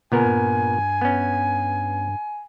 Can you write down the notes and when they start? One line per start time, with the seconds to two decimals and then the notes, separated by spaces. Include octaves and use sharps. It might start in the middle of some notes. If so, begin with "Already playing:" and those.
0.12 A#2 C#3 B3 A#4 G#5
0.25 G2
1.01 B3 C#4